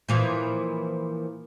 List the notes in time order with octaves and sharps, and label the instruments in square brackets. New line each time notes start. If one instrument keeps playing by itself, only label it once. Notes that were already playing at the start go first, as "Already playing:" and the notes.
[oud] A#2 E3 F3